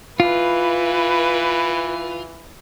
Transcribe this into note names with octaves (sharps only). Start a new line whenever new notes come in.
E3 F4 B4